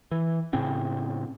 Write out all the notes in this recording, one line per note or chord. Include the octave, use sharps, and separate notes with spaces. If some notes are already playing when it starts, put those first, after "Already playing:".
E3
A2 C#3 C4 C#4